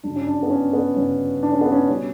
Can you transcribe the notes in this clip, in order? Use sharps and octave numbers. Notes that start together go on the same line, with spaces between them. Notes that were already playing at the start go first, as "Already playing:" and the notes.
G1 F#2 C#3 D4
C#4
D4
B3
C#4
B3
G1 F#2 C#3 C#4
D4
C#4
B3
C#4
B2 G3 C#4